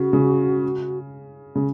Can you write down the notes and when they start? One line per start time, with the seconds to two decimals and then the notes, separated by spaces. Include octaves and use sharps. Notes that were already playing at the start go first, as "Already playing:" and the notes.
Already playing: C#3 F#4
0.13 C#3
1.55 C#3